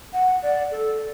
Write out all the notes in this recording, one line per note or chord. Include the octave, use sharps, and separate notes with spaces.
F#5
D5
A4